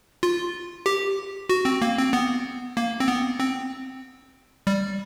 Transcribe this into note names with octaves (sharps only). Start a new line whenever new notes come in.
F4
G4
F#4
C4
A#3
C4
B3
A#3
C4
B3
C4
G3